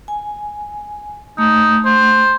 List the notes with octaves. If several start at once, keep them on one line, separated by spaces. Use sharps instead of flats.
G#5
A3 D#4
C5